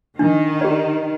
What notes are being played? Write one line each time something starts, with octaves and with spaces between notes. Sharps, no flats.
D#3 D4
G4 D5